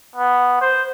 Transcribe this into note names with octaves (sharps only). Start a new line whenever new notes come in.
B3
C5